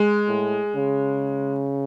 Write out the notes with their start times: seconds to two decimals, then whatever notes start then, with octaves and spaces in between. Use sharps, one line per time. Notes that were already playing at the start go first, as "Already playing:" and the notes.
Already playing: G#3
0.28 A2
0.75 C#3